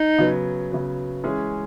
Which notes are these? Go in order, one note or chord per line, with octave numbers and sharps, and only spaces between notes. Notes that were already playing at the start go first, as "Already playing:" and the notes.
Already playing: D#4
C#3 F#3 B3
C#3 F#3 B3
E3 G#3 C#4 G#4